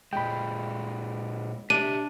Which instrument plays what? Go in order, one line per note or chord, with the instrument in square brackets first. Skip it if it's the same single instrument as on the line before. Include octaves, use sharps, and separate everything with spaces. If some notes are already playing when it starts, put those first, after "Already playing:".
[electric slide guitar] A#2 G#3 [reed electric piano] G5 B5
[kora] D4 [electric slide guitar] G4 D#5 E5 [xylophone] D#7